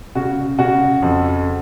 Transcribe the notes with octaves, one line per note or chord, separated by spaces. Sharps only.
C#3 F#4
C#3 F#4
F2